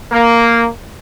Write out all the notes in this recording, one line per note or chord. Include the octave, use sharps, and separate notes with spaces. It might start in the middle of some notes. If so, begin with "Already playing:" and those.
A#3